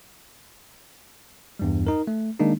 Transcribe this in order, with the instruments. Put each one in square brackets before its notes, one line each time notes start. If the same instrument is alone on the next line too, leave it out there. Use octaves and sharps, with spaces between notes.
[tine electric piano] E2 G2 G3
D#4 A#4
A3
D#3 G#3 A#3 D4 D#4